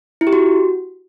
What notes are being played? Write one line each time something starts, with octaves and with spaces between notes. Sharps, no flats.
E4
G4
F#4